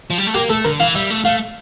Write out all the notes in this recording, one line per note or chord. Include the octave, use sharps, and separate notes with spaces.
F3
G3
A3
A#3 G4
A3 A4
D3 A#4
E3 F5
G3 E5
A3
A3 F5